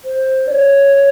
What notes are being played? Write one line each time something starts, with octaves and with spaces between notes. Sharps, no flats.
C5
D5
C#5